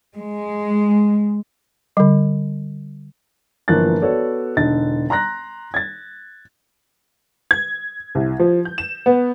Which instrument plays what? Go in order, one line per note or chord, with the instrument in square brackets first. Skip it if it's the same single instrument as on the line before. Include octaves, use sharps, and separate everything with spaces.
[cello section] G#3
[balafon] D3 G3
[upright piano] G1 E3 F3 A#3 F#6 A6
B3 F#4 A4 C#5 D5
E1 D3 D#4 A6
A#5 C6 F#6 A#6
G#6 A6
[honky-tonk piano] G#6
C2
F3
G6
E7
B3